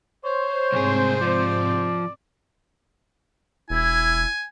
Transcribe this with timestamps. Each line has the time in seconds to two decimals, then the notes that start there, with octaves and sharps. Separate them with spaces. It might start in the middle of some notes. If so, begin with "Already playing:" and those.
0.25 C5 C#5
0.72 C2 G#2 C3 C4 G#4
1.21 F3 D5
3.70 E1 E4 G#5